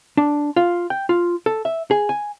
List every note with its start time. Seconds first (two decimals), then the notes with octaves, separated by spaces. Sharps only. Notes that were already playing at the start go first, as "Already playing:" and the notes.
0.17 D4
0.56 F4
0.90 G5
1.09 F4
1.46 A4
1.65 E5
1.91 G#4
2.09 G#5